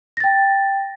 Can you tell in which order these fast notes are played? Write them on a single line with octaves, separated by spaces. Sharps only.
A#6 A6 G5